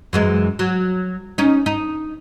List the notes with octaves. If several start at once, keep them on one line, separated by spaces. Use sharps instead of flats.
F#2 E3 G#3
F#3
C#4 D#4
D#4